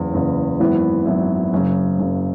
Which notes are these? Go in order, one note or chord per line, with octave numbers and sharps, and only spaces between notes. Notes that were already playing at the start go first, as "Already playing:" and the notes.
Already playing: F#1 E2 C#3
F#1 E2 C#3
G#1 F#2 E3 B3 E4
G#1 F#2 E3 B3 E4
F#1 F#2 C#3
F#1 F#2 C#3